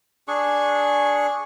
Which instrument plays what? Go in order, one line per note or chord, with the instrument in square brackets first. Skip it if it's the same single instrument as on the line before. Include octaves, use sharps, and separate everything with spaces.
[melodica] D4 G#4 C#6